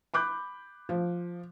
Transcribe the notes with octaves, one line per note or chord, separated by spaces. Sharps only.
B5 D6 F#6 G6
F3